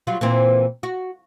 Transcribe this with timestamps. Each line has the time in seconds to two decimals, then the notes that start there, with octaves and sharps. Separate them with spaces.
0.07 F#3 G3 F4
0.21 A#2 E3 C4
0.83 F#4